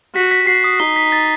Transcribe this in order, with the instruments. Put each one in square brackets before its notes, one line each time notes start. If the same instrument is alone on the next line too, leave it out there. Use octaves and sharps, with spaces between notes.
[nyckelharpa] F#4 [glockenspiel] B6
[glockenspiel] B6
[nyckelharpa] F#4 [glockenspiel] C7
[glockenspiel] D#6
[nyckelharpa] D#4 [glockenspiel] G7
[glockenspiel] B6
A6